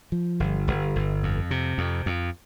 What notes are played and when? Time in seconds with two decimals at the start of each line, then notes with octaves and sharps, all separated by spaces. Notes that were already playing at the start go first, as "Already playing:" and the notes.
0.12 F3
0.40 G1
0.68 G1
0.96 G1
1.23 F2
1.51 C3
1.78 F2
2.06 F2